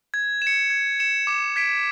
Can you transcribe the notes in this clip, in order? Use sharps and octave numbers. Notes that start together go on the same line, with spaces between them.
G#6
E7
C#7
G#6
C#7 E7
D6
G#6 B6 D7